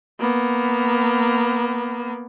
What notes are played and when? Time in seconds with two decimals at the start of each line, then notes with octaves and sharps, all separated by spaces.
0.20 A#3 B3